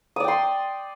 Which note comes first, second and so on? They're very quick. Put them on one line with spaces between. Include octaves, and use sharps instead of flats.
D#6 D5 G5 C6